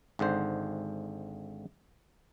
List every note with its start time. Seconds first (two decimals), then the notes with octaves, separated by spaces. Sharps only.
0.19 G#1 G#2 D3 C5